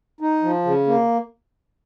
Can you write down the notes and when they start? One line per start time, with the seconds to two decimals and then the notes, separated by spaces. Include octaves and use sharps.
0.21 D#4
0.43 F3
0.65 C#3
0.87 A#3